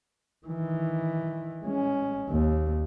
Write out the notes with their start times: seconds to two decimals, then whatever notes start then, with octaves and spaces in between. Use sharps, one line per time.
0.46 D#3 E3
1.64 G#3 C#4
2.29 D#2